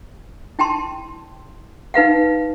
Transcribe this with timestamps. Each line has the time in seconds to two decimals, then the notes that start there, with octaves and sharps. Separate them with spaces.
0.59 E4 G5 A5 C6
1.94 D#4 B4 F5 F#5